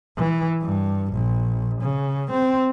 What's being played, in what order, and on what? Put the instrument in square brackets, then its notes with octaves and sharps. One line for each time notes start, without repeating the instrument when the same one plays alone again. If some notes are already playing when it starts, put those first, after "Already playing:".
[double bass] E3
G2
A#1
C#3
C4